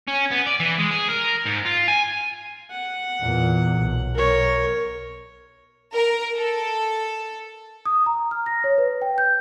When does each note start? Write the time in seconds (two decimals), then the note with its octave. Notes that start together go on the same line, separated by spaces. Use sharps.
0.08 C#4
0.31 B3
0.46 D5
0.60 E3
0.79 G#3
0.91 G#4
1.10 A#4
1.46 G#2
1.66 F4
1.88 G#5
2.70 F#5
3.21 E2 A#2
3.79 B1
4.14 A#4 C#5
5.94 A#4
6.36 A4
7.86 D#6
8.06 A#5
8.31 F6
8.46 A#6
8.64 C#5
8.78 B4
9.02 G5
9.18 G6